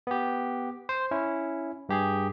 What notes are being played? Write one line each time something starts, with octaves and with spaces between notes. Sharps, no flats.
B3 G4
C5
C#4 E4
G2 G4 G#4